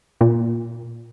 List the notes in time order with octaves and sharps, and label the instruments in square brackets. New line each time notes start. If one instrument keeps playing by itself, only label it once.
[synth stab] A#2